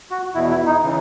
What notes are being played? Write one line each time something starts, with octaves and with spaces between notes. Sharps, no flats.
F#4
E2 B2 E4
E4
D#4
C#3 E3